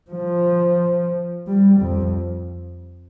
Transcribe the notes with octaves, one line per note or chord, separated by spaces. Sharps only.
F3
G3
F2